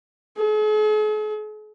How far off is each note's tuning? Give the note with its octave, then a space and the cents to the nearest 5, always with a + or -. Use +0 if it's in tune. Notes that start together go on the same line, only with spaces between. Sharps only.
G#4 +45